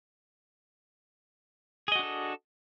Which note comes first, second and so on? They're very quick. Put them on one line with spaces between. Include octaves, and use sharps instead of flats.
G#4 D#5 F#4 D4 A4